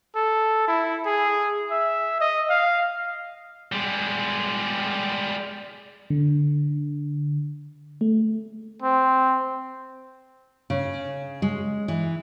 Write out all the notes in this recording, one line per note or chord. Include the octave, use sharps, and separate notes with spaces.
A4
E4
G#4
E5
D#5
F5
G3 G#3
D3
A3
C4
C#3
G#3
E3